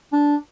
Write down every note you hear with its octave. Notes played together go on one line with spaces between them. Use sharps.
D4